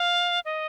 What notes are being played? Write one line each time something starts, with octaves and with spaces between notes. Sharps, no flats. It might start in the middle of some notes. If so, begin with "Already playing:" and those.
Already playing: F5
D#5